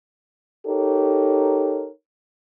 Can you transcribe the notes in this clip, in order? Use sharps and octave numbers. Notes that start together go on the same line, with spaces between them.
D#4 G4 A4 A#4 C#5